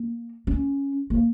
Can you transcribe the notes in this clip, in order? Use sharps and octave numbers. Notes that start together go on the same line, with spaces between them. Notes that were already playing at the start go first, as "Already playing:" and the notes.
Already playing: A#3
C#4
A#3